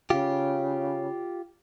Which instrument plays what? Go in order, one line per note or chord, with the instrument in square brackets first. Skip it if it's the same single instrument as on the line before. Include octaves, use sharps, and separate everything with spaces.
[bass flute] C#3 [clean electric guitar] F4 G4